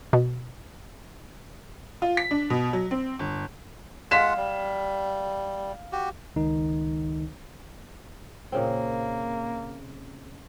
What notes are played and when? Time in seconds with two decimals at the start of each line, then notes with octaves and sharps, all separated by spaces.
0.13 B2
2.02 F4
2.17 B6
2.31 D4
2.50 B2
2.73 F#3
2.91 C4
3.19 G1
4.11 G#3 F4 F5 F#5 B6 E7
4.37 G3
5.92 F#4 G4
6.36 C#2 D#3 D#4
8.52 A#2 C#3 A#3 C4